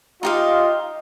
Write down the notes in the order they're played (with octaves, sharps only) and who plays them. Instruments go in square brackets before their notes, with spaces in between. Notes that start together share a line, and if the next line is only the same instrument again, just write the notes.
[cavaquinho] D#4 G4 F5 [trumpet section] F4 D#5